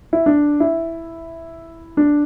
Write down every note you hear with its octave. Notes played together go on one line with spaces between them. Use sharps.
E4
D4
E4
D4